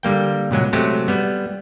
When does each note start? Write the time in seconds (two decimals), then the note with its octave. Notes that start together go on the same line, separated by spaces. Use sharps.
0.03 D3 G3 A#3 G5
0.51 A#2 C#3 F#3 G#3
0.73 C3 F#3 G#3 A3 F#4 G4
1.08 G3 B3